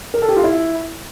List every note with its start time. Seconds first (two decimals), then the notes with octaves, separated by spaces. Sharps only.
0.14 A#4
0.22 A4
0.29 G4
0.36 F4
0.44 E4